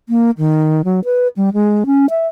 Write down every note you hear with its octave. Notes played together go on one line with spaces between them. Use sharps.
A#3
D#3
F#3
B4
G3
G#3
C#4
E5